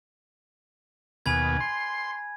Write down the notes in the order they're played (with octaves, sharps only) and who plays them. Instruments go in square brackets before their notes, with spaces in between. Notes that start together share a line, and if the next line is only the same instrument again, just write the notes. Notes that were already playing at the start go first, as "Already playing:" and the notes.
[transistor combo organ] D#2 B2 [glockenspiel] G#5 B5 G#6
[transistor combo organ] C6